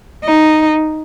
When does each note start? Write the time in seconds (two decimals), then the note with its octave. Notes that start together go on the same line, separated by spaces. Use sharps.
0.24 D#4